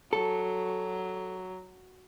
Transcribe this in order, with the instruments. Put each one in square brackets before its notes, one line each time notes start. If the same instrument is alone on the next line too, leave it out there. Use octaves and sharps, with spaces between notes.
[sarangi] F#3 [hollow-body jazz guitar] A4